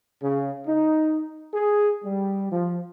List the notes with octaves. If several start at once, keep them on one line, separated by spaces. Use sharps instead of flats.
C#3
D#4
G#4
G3
F3